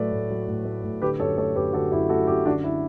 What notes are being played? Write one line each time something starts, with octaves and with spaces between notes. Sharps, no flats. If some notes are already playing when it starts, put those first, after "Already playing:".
Already playing: A2 F#3 A3 B4 D5
A2
F#3
A2
A3
A2
D3 G4 B4
F#2 A4 C#5
A3 A4 C#5
F#2 G4 B4
D3 F#4 A4
F#2 E4 G4
A3 F#4 A4
F#2 E4 G4
D3 D4 F#4
E4